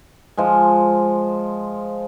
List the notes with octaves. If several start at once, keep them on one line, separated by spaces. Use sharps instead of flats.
F3 G#3